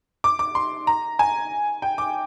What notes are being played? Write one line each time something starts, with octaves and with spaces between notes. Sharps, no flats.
D6
D6
C6
A#5
G#5
G5
D6